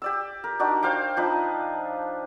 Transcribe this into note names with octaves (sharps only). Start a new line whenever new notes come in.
G4 D5 E6
A#4
D4 D#4 F#4 D5
C5 F5 G5 D6
F3 D4 D#4 B4